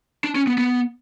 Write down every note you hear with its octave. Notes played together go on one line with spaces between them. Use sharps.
D4
C#4
B3
B3